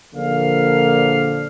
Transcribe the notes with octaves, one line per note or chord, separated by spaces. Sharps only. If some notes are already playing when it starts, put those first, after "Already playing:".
A#1 D3 F3 A#3 F5